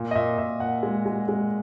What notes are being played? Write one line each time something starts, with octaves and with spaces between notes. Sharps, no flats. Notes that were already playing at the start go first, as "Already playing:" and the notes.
Already playing: A#2
D#5
A#2 E5
A#2 E5
A#2 F#5
G#3
G#3
G#3